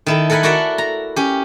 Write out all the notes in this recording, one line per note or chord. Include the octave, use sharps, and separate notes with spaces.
D#3 E4 A4
A4 A#4 F#5 G#5 B5
F#4 A4 A#4 D5 E5 F#5
A#5
C#4 G4